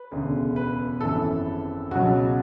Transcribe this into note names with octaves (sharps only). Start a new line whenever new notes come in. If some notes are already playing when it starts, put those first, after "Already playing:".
Already playing: B4
E1 D2 C#3
B4
G#1 F#2 E3 A4
C#2 B2 F#3 F#4